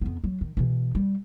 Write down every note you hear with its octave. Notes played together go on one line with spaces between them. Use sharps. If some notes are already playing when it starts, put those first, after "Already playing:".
F2 B3
F#3
D#3
B2 E3
G3